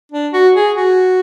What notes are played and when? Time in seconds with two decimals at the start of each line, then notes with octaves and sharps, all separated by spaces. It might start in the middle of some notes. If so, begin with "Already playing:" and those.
0.12 D4
0.33 F#4
0.56 G#4
0.77 F#4